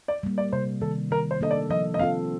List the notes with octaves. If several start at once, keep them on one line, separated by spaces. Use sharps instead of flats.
D5
G3 A#3
D5
C3 C5
D#3 A#3 A4
D#3 A#4
C5
A#3 D4 A4 D#5
D5
F3 D#5
D#5
C4 F4 A4 F5